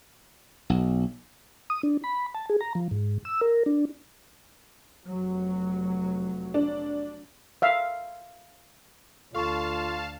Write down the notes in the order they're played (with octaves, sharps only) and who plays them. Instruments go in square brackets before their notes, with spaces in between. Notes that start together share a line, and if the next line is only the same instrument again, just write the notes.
[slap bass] B1
[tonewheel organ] D#6
D4
B5
A5
G#4
A#5
F3
G#2
E6
A#4
D4
[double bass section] F1 F#3
[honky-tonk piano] D4
[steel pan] E5 F5
[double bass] D2 [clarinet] F4 [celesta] A4 C#6 [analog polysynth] F5 A5